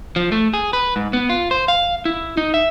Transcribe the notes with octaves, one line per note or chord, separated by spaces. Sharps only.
F3
A3
G#4
B4
G#2
B3
F4
C5
F5
E4
D#4
E5